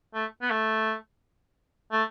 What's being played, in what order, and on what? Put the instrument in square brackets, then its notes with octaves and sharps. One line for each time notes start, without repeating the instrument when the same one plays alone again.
[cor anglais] A3
B3
A3
A3